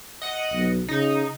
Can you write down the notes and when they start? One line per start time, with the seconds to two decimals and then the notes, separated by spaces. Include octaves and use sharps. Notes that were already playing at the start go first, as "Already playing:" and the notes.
0.22 D#5 F#5
0.52 B1
0.88 C#3 D#4